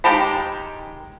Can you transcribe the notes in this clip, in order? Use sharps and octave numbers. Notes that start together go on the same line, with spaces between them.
D#3 G#3 G4 A5 B5